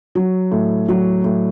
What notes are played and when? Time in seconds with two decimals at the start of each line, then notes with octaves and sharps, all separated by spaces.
0.15 F#3
0.51 A2
0.88 F#3
1.24 A2